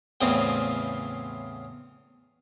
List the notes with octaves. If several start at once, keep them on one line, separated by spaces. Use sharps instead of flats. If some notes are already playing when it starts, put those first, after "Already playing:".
E2 A2 C#3 F3 C4